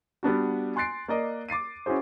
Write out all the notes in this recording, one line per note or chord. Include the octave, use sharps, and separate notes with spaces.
G3 B3 D4 F#4
G#5 C6 F#6 A6 C7 D7
A#3 D5 D#5
D6 A6 C7 D#7
C#4 E4 F#4 G#4 C5